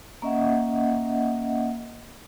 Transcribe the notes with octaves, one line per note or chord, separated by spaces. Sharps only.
A#3 C#4 D#5 E5 F#5